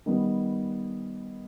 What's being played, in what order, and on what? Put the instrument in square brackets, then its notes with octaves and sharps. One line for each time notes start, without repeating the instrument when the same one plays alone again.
[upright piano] D#3 G3 B3